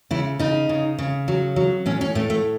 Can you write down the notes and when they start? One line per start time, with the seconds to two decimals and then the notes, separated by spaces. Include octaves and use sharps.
0.11 C#3 E4
0.39 C#3 D#4
0.69 C#3
0.99 C#3
1.28 F#3
1.56 F#3
1.86 A2 C#4
2.01 C#4
2.15 A2 A3
2.30 A3